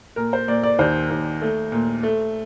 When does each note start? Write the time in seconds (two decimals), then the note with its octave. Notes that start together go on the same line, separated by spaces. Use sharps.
0.16 A#2 A#4
0.33 C5
0.48 A#2 D5
0.63 D5
0.79 D#2 C5
1.10 D#2
1.41 A3
1.72 A#2
2.03 A3